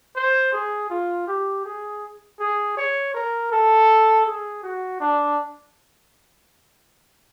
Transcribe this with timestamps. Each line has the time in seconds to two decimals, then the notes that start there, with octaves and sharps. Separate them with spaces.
0.16 C5
0.53 G#4
0.90 F4
1.28 G4
1.66 G#4
2.40 G#4
2.77 C#5
3.15 A#4
3.52 A4
4.26 G#4
4.63 F#4
5.00 D4